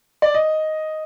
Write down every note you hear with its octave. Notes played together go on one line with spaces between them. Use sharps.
D5
D#5